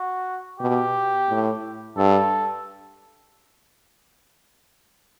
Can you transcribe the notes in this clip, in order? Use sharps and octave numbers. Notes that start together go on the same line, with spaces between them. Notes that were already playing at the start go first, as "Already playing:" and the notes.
Already playing: F#4
B2 G4
A2
G2 A4